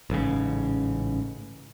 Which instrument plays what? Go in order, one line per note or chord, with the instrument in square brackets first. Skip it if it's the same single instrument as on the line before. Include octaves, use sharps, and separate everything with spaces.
[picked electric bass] A1 G#2 C#3